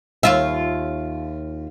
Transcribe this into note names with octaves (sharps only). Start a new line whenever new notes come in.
D#2 F4 E5